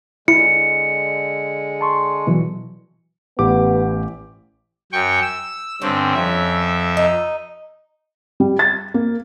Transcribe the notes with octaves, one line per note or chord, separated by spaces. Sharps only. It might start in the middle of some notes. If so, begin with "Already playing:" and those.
D3 G#3 E4 C#7
A5 C6 C#6
B2 E3 F#3
A1 B3 G4 D6
F#2 G5 C#6
E6
G2 D3 C4 C#4
F2 E5
D#4
G3
A6
A#3